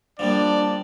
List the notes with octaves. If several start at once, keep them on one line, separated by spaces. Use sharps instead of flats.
F3 G3 A#3 D4 D5